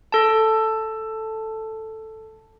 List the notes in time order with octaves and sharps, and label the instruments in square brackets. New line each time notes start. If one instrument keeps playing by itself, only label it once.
[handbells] A4 A5